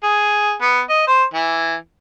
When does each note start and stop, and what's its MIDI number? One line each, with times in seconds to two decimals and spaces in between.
0.03 0.54 68
0.61 0.81 59
0.89 1.07 75
1.07 1.24 72
1.34 1.75 52